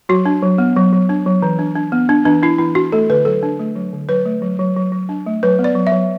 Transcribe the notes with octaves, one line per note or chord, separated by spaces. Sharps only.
F#3 F#4
D4
F#3
B3
F#3
F#3
D4
F#3
E3
D4
D4
B3
D4
E3 D4
D4 E4
E3 E4
D4 F#4
A3 A4
D3 B4
F#3 A4
D4
A3
F#3
D3
F#3 B4
A3
F#3
F#3
F#3
F#3
D4
A3
F#3 B4
B3
D5
F#3
E5
F#3